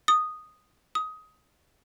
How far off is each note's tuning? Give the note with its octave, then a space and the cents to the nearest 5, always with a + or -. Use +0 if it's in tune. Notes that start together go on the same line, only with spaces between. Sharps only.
D#6 -5
D#6 +15